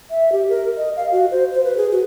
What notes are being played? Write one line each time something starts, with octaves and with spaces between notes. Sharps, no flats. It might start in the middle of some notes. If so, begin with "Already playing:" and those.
E5
G4
A#4
D#5
F5
F#4
C5
C5
B4
G#4
F#4